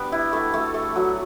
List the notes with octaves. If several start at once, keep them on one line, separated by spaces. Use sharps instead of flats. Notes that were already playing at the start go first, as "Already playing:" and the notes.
Already playing: G3 B3 D4 G4
E4
A3
A3
A3
F#3